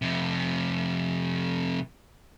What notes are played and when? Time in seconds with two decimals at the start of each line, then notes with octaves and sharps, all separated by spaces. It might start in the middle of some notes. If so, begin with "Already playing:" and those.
0.02 F2 C3